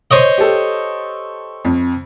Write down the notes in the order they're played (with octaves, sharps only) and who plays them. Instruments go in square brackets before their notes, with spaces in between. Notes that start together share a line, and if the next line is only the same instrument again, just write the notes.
[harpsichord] C5 C#5 D#5
[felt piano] G4 A4
F2